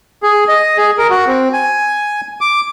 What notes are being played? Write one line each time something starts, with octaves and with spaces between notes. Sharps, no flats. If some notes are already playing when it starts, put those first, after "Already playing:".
G#4
D#5
G#4
A#4
F#4
C4
G#5
D6